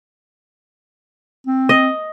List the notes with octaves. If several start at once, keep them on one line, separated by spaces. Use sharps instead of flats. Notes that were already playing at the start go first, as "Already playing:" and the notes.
C4
D#5